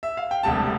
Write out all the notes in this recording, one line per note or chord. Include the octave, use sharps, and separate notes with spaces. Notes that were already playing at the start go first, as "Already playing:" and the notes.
E5
F5
G5
E1 D2 C3 G3 A5